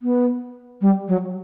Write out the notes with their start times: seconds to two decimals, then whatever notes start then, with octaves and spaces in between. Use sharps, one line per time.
0.02 B3
0.81 G3
1.08 F#3